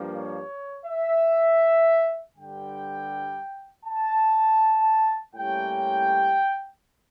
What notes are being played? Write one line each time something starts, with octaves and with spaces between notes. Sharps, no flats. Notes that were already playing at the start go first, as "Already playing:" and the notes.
Already playing: G2 F3 A#3
C#5
E5
G2 D3 G3 G5
A5
A2 G3 A#3 C#4 E4 G5